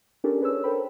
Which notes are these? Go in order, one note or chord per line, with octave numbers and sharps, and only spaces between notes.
C#4 D4 G4 A4 A#4 D5
G#4 B4 C#5 E6
A4 A#4 C5 G5 B5